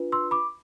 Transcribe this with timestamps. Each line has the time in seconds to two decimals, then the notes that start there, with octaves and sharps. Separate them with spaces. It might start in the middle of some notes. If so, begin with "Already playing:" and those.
Already playing: D4 F4 B4
0.12 C6 E6
0.31 B5 D6